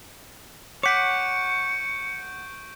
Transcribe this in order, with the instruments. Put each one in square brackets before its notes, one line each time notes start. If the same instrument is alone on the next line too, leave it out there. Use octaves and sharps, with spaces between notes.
[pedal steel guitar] C#5 F#5 [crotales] C#6 G6 D7 [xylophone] D6 B6 [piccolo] C#7